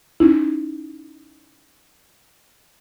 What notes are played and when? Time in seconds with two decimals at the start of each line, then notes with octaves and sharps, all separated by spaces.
0.20 C#4 D#4 E4